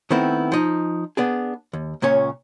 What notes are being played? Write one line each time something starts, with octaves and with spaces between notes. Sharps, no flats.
D#3 A3 B3 C4 E4
F3 D#4
B3 D4 G#4
D#2
C#2 A#2 C#4 C#5